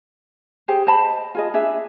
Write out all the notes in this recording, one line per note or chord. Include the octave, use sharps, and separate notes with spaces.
G4 G#4 C5
C5 D#5 A5 B5
F4 G#4 D#5
D4 G#4 E5